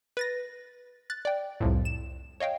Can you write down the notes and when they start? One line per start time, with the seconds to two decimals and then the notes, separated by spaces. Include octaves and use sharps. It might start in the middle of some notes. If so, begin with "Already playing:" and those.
0.17 B4 A6 A#6
1.10 F#6 A6
1.25 D5 G5
1.61 C2 F2 A2
1.85 E7
2.40 C#5 D#5 F5 G5